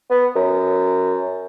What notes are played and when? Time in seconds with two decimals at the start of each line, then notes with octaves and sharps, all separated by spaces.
0.10 B3
0.36 F#2